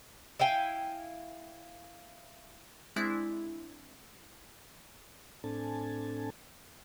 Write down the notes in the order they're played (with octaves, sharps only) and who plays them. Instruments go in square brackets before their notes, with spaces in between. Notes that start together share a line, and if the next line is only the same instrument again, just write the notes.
[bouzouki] E4 F5 G5 G#5
[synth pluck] G#3 C4 D4 E4
[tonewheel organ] A2 C4 D4 A4 G#5 A5